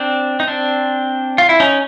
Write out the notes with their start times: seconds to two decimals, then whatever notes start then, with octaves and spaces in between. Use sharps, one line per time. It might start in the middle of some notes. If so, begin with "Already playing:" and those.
Already playing: C4 D4
0.40 D#4
0.47 C4 D4
1.38 F4
1.49 E4
1.60 C#4 D#4